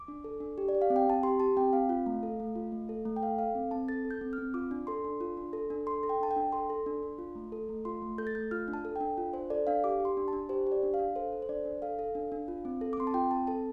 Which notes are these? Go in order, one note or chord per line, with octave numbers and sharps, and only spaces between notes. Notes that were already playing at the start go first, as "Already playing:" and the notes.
Already playing: D6
D4
A4
D4
G4
D5
G4
F5
C4
G5
C4 A5
G4 C6
G4 A5
C4 G5
C4 F5
F4
A3
A4
A3
F4
A3
A4
A3
G5
A4 F5
A4 F5
C4
C4 A5
A4 A6
A4
G6
C4
F6
C4
F4 D6
D4
A4 C6
D4
F4
D4
A4
D4
A4 C6
A4
G5
D4 A5
G5
D4
A4 C6
A4
D4
D4
F4
A3
A4
A3
F4 C6
A3
A4 G6
A6
A3 G6
F4 F6
D4
A5
A4
G5
D4
F4
D4 C5
A4 D5
D4 F5
G4 D6
G4
C6
D4
A5
D4
G4 C5
G4
D5
D4
F5
D4
A4 C5
A4
C5
D4 D5
D4
A4 F5
A4
D4
D4
F4
C4
A4
D6
C4 C6
A5
F4 G5
C4 A5
A4 A5